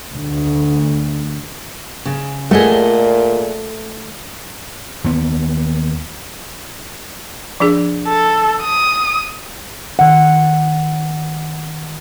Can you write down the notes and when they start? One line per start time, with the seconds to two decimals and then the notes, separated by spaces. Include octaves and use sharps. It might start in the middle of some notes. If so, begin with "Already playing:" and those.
0.14 D2
2.05 C#3
2.51 A#2 A3 G#4 D#5 F#5
5.04 D#2 B3
7.60 F3 D4 G#4
8.08 A4
8.62 D#6
9.99 D#3 F#5